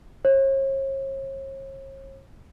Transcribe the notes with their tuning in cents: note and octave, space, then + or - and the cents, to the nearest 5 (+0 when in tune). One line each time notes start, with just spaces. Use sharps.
C#5 -40